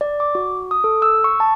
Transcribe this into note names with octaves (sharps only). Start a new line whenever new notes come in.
D5
D6
F#4
D#6
A4
E6
C#6
A5